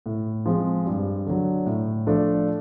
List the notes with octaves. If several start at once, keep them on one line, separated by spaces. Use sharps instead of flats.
A2
F3 G#3 C4
G2
D3 F#3
A2
F3 A3 D4